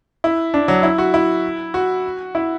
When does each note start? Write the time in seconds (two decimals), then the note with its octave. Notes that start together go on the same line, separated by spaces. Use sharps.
0.24 E4
0.54 D4
0.68 F#3
0.83 E4
0.98 F#4
1.14 E4
1.74 F#4
2.35 E4